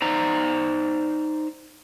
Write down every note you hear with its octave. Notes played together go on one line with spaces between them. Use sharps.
D#4 C5 D5 A#5